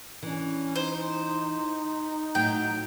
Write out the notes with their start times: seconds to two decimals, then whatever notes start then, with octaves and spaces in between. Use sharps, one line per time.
0.23 E3 C#4 D4
0.76 D#4 C5
2.35 A2 F#3 G5